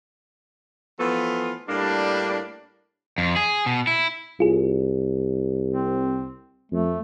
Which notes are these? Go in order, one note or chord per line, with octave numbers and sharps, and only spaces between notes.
E3 F3 A3 B3 F4
A2 G3 A#3 D4
F2
G#4
B2
E4
C2 F4 G#4
C4
F2 A3